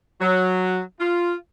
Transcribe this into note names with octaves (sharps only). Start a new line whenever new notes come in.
F#3
F4